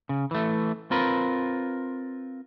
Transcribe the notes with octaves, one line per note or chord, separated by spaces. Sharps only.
C#3
E3 A3
C4 F4 A#4 B4